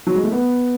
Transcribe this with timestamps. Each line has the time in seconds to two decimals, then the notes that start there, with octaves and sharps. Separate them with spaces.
0.07 F#3
0.15 G#3
0.24 A3
0.32 B3